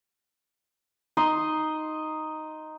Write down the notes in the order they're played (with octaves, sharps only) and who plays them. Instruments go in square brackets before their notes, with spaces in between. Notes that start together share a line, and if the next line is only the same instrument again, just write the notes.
[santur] D#4 D#5 C6